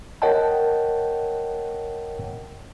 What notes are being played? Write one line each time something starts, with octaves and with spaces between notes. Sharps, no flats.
A#4 C#5 D#5 F#5 G5 A5